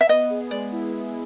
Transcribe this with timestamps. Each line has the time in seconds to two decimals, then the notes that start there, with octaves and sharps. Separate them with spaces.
0.01 E5
0.09 B3 D#5
0.30 G#4
0.51 G#3 D5
0.72 E4
0.92 B3